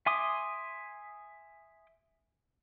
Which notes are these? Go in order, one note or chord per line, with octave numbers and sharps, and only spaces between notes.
E5 G#5 C6 D6 D#6